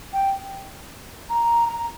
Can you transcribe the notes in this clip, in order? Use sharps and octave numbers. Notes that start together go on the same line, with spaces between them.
G5
A#5
A#5